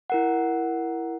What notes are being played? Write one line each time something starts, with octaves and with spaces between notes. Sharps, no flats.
E4 A#4 F#5